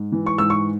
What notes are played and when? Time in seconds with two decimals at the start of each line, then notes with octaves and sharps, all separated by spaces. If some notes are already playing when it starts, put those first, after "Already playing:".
Already playing: G#2
0.12 E3
0.26 C#6
0.38 G#2 E6
0.50 C#6